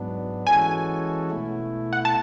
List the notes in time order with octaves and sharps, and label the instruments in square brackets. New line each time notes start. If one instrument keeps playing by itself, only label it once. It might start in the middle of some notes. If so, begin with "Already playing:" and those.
Already playing: [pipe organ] G#2 F#3 B3 D4
[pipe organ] E3 G#3 C#4 F#4 A4 [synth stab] G#5
[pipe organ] B2 A3 E4
[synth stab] F#5
A5